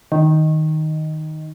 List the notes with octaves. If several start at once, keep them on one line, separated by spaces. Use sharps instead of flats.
D#3